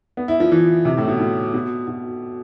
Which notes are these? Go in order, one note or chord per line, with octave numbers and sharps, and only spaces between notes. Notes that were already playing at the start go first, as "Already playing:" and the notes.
B3
E4
F3
E3
C3
A2
B2
A2
B2
B2